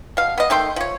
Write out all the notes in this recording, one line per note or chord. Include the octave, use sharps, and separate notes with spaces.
B2 F5
B3 D#5
D#3 A3 G5 C6
F3 C#5